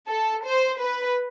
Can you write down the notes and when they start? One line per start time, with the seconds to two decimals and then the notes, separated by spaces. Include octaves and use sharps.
0.09 A4
0.45 C5
0.81 B4